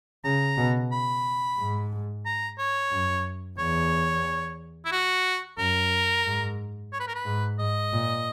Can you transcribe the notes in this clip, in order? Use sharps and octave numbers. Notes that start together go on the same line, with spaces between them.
C#3 A#5
B2
B5
G#2
A#5
C#5
F#2
E2 C#5
E4
F#4
F#2 A#4
G#2
C#5
B4
A#4
B4
G#2
G#2 D#5
A#2